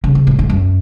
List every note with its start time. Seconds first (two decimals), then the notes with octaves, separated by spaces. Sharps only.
0.04 C#3
0.15 C3
0.27 A2
0.39 G#2
0.50 F#2